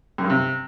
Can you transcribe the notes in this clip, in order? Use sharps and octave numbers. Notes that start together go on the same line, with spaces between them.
F#2
G2
C3